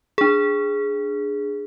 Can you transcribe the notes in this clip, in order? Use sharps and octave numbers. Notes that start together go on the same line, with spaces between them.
D4 G#4